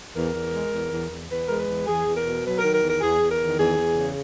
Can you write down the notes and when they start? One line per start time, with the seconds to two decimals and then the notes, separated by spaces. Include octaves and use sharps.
0.15 E2 A#4
0.34 E2
0.53 G#3
0.72 E2
0.92 E2
1.10 E2
1.30 E2 B4
1.47 G#3 A#4
1.59 B4
1.68 E2
1.87 E2 G#4
2.06 E2
2.15 A#4
2.25 B2
2.44 F#3 B4
2.59 A#4
2.64 D#3
2.72 A#4
2.83 E2 A#4
3.01 E2 G#4
3.20 E2
3.29 A#4
3.40 D#3
3.58 E2 G#4
3.78 E2
3.96 C#3